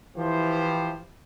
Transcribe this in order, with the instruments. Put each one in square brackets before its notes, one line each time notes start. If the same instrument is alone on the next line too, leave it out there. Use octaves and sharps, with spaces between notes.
[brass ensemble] E3 F3 E4 G4 C5